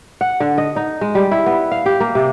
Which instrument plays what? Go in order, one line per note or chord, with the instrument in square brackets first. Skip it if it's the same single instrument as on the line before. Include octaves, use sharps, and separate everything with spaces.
[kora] F#5
D3
D#5
D#4
G#3
G3
E4
B3
F5
G4
A#3
C3